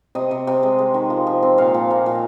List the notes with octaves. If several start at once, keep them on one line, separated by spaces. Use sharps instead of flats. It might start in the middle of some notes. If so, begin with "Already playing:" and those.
C3 D#5
C3
C3
G#3
G#3
D#3
F3
F3
C4
A#2 F5
A#2
A#3
A#2